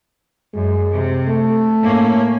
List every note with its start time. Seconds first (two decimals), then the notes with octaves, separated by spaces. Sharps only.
0.54 F#2 G#3
0.93 C3
1.29 A3
1.83 A2 A#3 C#4